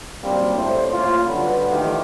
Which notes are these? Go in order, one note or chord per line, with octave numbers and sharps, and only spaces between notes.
G#1 F#2 G3 A#3 C4 D4
A2 C5
A#3 C#4 E4 F4
G2 D3 F#3 F#4 B4
D#3 E3 A3 F4 G4